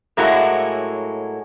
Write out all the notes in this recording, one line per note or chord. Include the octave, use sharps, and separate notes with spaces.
A2 F#3 G#3 A#3 E4 F#4